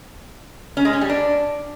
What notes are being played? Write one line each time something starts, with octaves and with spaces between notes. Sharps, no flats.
C#4
G#3
C#4
G3
D4